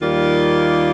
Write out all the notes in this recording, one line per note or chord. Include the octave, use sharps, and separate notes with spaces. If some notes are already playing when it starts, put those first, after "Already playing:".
D#2 D#3 G3 A#3 F4